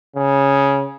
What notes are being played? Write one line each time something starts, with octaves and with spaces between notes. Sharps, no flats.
C#3